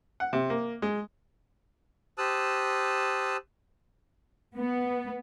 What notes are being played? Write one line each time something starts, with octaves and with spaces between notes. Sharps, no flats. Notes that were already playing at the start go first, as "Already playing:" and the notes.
F#5
C3
A#3
G#3
G4 C5 A5 D#6 E6 F#6
B3